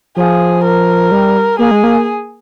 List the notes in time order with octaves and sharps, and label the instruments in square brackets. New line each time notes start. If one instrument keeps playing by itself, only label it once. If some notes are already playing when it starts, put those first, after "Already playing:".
[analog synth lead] F3 [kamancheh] G#4
[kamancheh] A#4
[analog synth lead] G3
[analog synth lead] A#3 [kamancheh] G#4
[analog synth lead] G#3
A#3